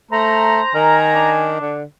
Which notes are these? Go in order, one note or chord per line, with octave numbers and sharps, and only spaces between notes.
A3 C5 A5 A#5
D#3 A#4 G#5
D4
D3